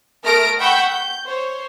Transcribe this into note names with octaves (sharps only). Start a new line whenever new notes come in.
A3 A#4 D#6 F6 A#6 D7
F#5 G5 B5 C#6 E6 G6
G6
C5 C#5